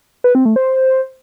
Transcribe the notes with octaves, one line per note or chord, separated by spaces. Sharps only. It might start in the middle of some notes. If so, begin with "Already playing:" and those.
B4
C4
A3
C5